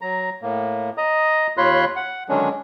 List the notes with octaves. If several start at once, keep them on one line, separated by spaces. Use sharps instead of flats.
F#3 A#5
A2 A#3
D#5 A#5 D#6
D#2 F4 C#5 B5 C6 F#6
F#5
D3 D#3 F#3 G#3 C#4 D4